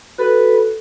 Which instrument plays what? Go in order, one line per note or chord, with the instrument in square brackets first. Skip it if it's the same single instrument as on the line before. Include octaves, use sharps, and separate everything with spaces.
[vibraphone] F#4 A4 [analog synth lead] B4